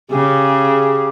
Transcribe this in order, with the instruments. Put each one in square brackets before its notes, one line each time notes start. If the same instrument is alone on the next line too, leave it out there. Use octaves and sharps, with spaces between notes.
[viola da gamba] C#3 [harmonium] G4 G#4